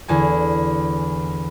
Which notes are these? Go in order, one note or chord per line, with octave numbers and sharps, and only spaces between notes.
E2 D3 G#5